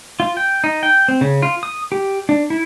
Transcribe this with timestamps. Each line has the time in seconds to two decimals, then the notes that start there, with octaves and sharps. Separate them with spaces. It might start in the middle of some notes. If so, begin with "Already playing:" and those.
0.20 F4
0.37 G5
0.64 D#4
0.83 G5
1.08 C4
1.21 C#3
1.42 F4
1.63 D#6
1.92 G4
2.29 D4
2.50 E4